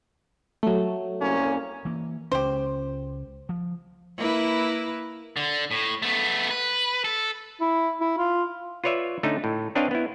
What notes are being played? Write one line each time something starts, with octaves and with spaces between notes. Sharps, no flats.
F#3 A3
C2 A#3 C#4
E3 A#3
C#2 C#4 G4 C5
F3
A#3 E4 B4
D3
A2
A3 B3
B4
A4
E4
E4
F4
F4 B4 C#5 D5 E5
D3 A3 C#4 D#4
A2
C4 D4 B4 C#5 D#5 F5
B3 E4